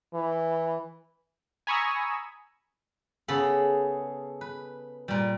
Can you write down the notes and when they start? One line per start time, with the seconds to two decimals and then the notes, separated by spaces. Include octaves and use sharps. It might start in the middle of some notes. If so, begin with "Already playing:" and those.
0.14 E3
1.67 G#5 A#5 B5 C#6 D#6 E6
3.28 C#3 B3 G#4 A4 B5
4.41 B4
5.08 A#2 G3